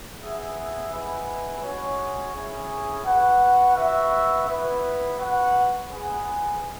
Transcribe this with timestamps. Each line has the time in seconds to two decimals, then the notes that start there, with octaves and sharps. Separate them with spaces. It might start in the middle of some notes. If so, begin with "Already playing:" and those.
0.21 B3 G#4 E5
0.91 G#3 E4 B4 F#5
1.62 G#3 C#4 F#4 C#5
2.34 C#4 E4 G#4
3.04 F#4 B4 F#5
3.75 F#4 B4 E5
4.47 B3 E4 B4
5.17 F#4 B4 F#5
5.88 G#3 B3 G#4